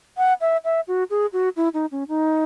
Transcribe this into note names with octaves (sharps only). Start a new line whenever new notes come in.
F#5
E5
E5
F#4
G#4
F#4
E4
D#4
C#4
D#4